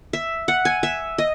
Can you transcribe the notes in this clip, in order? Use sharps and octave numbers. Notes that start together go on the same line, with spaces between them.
E5
F#5
G#5
E5
D#5